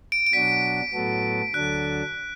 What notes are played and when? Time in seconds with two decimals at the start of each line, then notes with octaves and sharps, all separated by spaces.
0.12 D7
0.26 D7
0.33 B2 F#3 D4 F#4 B6
0.93 A2 F#3 B3 F#4 A4
1.54 D2 D3 F#3 D4 A4 F#6